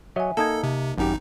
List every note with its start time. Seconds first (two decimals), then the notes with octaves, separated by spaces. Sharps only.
0.16 F#3 C#5 D#5 E5 G#5
0.37 A#3 D#4 A4 A5 D#6 G#6
0.63 C3
0.98 G#1 F#2 D#4 G4